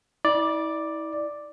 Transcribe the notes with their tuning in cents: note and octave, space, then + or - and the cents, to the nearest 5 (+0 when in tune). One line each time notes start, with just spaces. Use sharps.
E4 -40 D5 +5